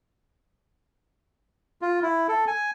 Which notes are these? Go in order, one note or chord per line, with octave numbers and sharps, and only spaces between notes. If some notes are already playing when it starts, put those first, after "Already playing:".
F4
E4
A4
G#5